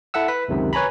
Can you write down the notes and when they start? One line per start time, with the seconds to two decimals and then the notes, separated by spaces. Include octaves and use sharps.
0.14 E4 A4 E5 F#5 E6
0.28 B4 B6
0.48 C#2 F#2 C3 D#3
0.73 B4 C#5 G#5 A#5 B5